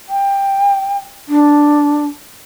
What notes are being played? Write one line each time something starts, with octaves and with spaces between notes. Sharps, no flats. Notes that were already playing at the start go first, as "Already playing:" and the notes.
G5
D4